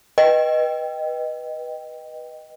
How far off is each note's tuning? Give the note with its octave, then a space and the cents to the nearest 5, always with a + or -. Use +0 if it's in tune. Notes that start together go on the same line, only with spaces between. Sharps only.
B4 -15 D#5 -5 G5 +0